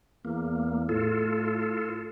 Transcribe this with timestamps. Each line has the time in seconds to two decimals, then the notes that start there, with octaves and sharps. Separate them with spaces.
0.25 E2 A#3
0.89 A2 F4 A4